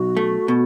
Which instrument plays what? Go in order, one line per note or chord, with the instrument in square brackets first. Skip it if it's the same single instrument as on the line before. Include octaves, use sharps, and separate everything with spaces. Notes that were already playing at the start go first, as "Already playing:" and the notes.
Already playing: [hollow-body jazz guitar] B1 [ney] F#4
[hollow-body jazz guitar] A3
B2